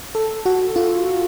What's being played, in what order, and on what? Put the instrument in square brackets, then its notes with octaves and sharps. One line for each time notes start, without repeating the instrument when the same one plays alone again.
[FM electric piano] A4
F#4
F4